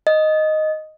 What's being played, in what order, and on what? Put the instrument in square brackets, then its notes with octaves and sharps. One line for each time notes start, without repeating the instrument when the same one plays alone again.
[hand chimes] D#5